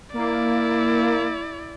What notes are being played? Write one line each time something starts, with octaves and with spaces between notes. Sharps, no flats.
A#3 E4 D5